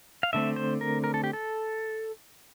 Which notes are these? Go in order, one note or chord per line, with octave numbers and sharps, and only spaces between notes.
F5
D3 A3 C4 E5
C5
A#4
A#4
A4
G4
A4